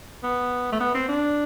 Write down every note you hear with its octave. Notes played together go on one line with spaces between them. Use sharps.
B3
A3
B3
C4
D4